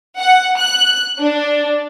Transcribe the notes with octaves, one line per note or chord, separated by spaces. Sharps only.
F#5
F#6
D4